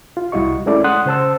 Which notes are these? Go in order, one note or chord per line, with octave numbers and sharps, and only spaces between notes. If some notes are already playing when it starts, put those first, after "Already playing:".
F4
C2 G3 E4 F#4 D#5 C#6
G#3 A3 C#4 E4 A4 D5
F#5 C6 D#6 F#6
C#3 C5 A5 E6